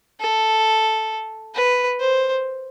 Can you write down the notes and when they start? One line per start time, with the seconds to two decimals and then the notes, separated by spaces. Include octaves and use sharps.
0.20 A4
1.54 B4
2.00 C5